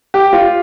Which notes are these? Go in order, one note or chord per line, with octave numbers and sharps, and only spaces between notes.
G4
F4